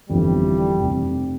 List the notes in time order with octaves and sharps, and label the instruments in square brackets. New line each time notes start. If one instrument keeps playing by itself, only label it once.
[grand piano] G1 F2 E3 [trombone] G3
[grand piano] F1 C3